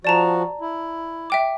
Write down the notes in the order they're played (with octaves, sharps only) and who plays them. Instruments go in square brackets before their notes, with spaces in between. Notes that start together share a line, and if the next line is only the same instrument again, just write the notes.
[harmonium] F3 F#4 [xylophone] D5 A5 A#5
[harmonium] E4
[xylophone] E5 G5 D6